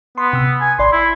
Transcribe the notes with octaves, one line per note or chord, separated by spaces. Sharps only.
B3 C6
C3 E6
G#5
G#1 D5 B5 C6
E4